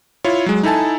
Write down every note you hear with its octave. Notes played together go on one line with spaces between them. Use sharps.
E4 F4 C#5
F#3 G#3
D#4 E4 A4 G#5 A5